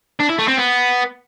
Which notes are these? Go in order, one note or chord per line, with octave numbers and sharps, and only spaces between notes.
D4
E4
A3
C4
B3